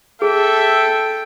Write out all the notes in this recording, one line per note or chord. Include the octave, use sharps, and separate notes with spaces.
G#4 A4 E5 G5